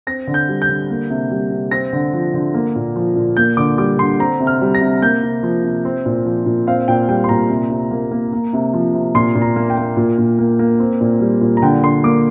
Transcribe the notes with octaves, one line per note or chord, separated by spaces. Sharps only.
C4 A#6
D3
G6
G3
G6
D3
A#3
C3
G3
C3
C4 A#6
D3
F3
D3
A#3
A#2
F3
A#2
A#3 G6
D3 D6
G3 D6
D3 C6
C4 A#5
C3
F6
G3
A#6
C3
A#3 G6
C3
F3
C3
C4
A#2
F3
A#2
C4 F5
A#2 G5
G3 G5
C6
A#2 A#5
C3
C3
A#3
A#3
A#3
C3
F3
C3
A#2 C6
A#2
A#5
A#3
G5
A#3
A#2
A#2
A#3
A#3
C4
A#2
G3
A#2
A#5
D3 G5
D3 C6
A#3 D6